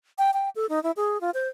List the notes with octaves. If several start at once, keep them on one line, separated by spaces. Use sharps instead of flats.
G5
G5
A4
D#4
E4
G#4
F4
C5